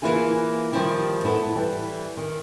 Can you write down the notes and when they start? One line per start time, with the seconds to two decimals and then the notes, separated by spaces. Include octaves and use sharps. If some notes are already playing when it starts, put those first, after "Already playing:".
0.02 E3 A#3 E4 F4 G#4
0.72 D#3 F3 G3 E4 G4
1.24 B3 E4 A4
1.56 E3 G3
2.17 D#3